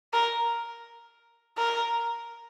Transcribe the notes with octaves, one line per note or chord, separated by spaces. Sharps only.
A#4
A#4